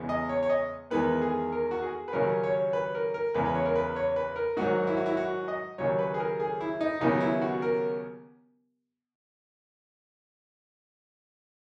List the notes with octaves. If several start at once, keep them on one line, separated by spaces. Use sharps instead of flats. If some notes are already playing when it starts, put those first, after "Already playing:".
Already playing: E2 C#3 G#3 B3
D#5
C#5
C#5
D#5
E2 D#3 G#3 B3 B4
G#4
A#4
F#4
G#4
B4
D#2 C#3 F#3 C#4 A#4
C#5
B4
A#4
A#4
E2 C#3 G#3 B4
B4
C#5
A#4
B4
C#5
B4
A#4
G#2 D#3 F#3 F#4
E4
F#4
E4
F#4
D#5
D#2 C#3 F#3 C#5
B4
G#4
A#4
G#4
E4
D#4
D#2 C#3 F#3 B3 D#4
E4
F#4
A#4